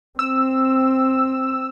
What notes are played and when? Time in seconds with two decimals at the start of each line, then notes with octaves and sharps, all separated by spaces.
0.19 C4 E6